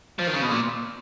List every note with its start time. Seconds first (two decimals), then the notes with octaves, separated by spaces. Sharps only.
0.19 F3
0.27 D#3
0.34 C#3
0.42 B2
0.51 A#2